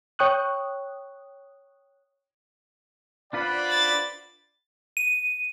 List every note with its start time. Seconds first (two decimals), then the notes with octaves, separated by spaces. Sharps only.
0.19 C#5 G5 C#6 D#6 F#6
3.33 D4 F4 B4 C5 D5 F#5 B5
3.71 A6
4.97 D#7